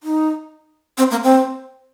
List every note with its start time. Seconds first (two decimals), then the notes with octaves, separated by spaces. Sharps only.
0.03 D#4
0.98 C4
1.11 A#3
1.23 C4